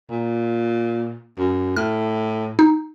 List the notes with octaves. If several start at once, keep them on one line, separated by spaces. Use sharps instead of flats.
A#2
F#2
A2 F6
D#4